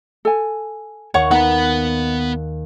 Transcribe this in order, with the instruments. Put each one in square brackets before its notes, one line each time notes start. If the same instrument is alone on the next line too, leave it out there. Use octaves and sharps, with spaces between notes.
[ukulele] A4 G#5
[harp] D#2 [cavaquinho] C#5 F#5 C#6
[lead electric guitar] B3 B4 [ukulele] D#4 [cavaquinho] F#5